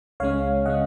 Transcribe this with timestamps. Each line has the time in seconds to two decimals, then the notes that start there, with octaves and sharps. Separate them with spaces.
0.20 C#2 C#3 G#3 C#4 C#5 F5
0.66 C#3 G#3 C#4 D#5 F#5